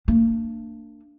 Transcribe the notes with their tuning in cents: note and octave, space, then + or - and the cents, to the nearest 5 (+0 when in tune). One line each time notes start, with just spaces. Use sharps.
A#3 -40 D4 +0